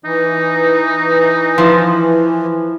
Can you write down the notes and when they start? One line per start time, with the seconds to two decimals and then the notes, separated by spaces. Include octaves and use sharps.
0.05 E3 D#4
1.58 F3 E4